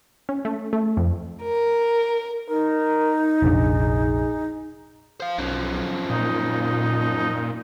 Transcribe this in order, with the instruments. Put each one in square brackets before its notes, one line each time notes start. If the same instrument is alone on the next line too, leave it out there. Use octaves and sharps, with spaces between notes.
[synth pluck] C#4
A3
A3
F2
[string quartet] A#4
[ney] D#4 [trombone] A#4
[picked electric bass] F1 A#1 D4 [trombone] G#4
[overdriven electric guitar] C5 F5
[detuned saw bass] B1 [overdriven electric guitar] F#2 F3
[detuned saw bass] A#2 [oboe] D#4